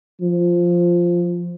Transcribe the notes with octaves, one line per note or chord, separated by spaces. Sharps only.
F3